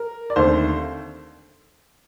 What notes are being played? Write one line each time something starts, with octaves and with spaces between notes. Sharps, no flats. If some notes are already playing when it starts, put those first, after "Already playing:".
Already playing: A#4
D5
D#2 D3 A3 C4 C5